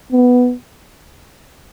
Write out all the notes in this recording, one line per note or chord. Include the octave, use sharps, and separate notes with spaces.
B3